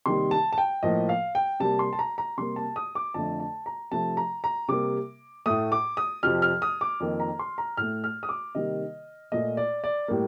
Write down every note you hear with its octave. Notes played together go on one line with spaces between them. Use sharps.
C3 D#3 G3 A#3 C6
A5
A5
G5
A2 F3 A#3 D#5
F5
G5
C3 G3 A#3 A5
C6
A5
A#5
A#5
C3 G3 A#3 C6
A5
D#6
D6
F2 D3 A3 A5
A5
A#5
C3 F3 A3 A5
A#5
A#5
C3 G3 A#3 D6
A2 A3 D#6
D6
D#6
F2 C3 F3 F6
F6
D#6
D6
F2 D#3 A#3
A#5
C6
A#5
A2 A3 F6
F6
D#6
D6
C3 D#3 G3 A#3 D#5
A#2 A3 D#5
D5
D5
A2 G3 A#3